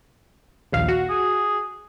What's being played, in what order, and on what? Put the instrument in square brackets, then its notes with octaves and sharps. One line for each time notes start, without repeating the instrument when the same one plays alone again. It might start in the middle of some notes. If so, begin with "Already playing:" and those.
[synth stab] A#1 D#2 F5
F#4
[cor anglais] G#4